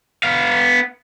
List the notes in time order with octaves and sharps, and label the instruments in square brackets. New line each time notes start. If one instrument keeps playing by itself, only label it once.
[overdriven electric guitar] B3 F5